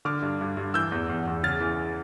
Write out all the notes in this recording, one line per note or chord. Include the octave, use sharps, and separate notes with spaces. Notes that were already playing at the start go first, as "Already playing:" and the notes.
D3 D6 F6
G2
G2
G2
E3 E6 G6
E2
E2
E2
C#3 F6 A6
E3